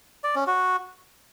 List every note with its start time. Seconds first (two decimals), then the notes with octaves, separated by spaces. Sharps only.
0.24 D5
0.35 C#4
0.47 F#4